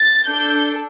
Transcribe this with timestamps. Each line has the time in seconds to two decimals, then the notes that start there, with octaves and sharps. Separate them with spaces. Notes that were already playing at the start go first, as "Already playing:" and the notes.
Already playing: A6
0.26 D4 A4 G6